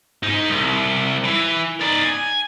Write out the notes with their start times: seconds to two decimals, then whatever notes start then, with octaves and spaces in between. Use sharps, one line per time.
0.23 G#2 D#4
0.50 C2
1.24 E3
1.81 D#4 D5
2.04 G#5